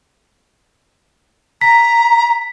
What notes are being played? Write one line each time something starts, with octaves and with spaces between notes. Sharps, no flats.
A#5 B6